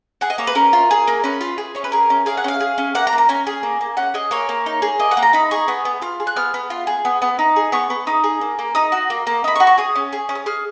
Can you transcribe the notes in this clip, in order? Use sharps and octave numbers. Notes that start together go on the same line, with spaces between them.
G#4 F#5
D#5
A#3 C#5
B4
C#4 A#4
F4
G#4
A#3
C#4 B4
F4
G#4
C#4 C#5
B4
G#4 A#4
C#4
G#4 F5
F#5
C#4 F5
G#4
C#4
A#3 F#5
A#5
A#3
A#5
C#4 G#5
G#4
A#3
A#3
C#4 F#5
G#4 D#5
A#3 C#5
A#3
D#4
G#4
A#3 D#5
F#5
A#3
A#5
D#4 B5
G#4 C#6
B3 D#6
B3
F4 F6
G#4
F#6
B3 F6
B3
F4
G#4
B3
B3
D#4
G#4
B3 C#6
B3
D#4 D#6
G#4
A#3
A#3
D#4 D#6
F#4
A#3
A#3
D#4 B5
C#6
F#4
C#6
G#4 D#6
C#4
G#4
C#4
D#6
G#4 F6